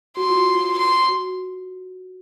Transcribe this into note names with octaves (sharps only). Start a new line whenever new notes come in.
F#4 C6
F4
F4
C6
F#4